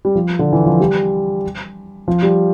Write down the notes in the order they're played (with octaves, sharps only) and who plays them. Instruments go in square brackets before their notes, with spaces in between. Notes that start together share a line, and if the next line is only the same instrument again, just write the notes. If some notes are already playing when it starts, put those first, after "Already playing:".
[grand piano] G3
F3
D3
E3
F3
G3
F3
G3